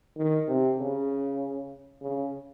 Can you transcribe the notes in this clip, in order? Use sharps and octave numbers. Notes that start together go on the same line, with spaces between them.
D#3
C3
C#3
C#3